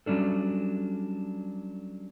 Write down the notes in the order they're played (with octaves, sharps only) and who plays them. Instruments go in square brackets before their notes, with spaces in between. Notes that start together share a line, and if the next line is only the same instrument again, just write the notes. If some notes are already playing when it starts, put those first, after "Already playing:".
[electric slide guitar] F#3 G3 C#4 D4 A4